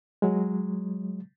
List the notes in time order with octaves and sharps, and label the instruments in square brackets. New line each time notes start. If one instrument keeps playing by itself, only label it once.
[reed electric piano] F#3 G#3